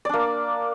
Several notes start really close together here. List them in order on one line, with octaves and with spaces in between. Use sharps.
D5 D4 A#3